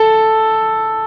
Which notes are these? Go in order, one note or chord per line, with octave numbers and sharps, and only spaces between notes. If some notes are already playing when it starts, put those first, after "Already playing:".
Already playing: A4